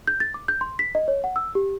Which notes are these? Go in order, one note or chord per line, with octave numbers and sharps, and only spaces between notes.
G6
A6
D6
G6
C6
B6
D#5
C#5
F#5
E6
G4